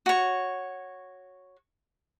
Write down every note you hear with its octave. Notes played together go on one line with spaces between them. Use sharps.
F#4 C#5